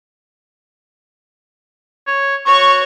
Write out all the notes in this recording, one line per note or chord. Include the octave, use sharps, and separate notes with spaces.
C#5
F#4 C#5 C#6